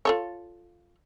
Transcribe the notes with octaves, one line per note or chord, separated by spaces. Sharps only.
F4 A4 C#5